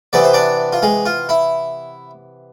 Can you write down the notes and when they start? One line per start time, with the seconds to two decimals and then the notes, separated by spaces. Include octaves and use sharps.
0.13 C3 E3 B3 D5
0.24 C5
0.34 D4 D5
0.73 F4
0.83 G#3 G#4
1.06 F4
1.29 E4